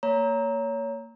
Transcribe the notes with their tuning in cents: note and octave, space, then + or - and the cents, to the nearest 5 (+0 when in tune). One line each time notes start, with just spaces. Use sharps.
A#3 -20 C#5 +20 A#5 +0